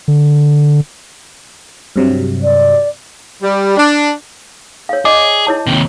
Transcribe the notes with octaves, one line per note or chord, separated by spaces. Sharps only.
D3
G2 C3 F#3
D5
G3
D4
C#5 F5
G#4 D5 D#5 D6
E4 C#5 A5
D#2 C3